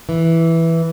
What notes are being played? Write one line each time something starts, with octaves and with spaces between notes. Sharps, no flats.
E3